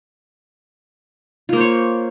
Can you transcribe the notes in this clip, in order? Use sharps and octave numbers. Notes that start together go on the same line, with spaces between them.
A#3 F4 C5 C#5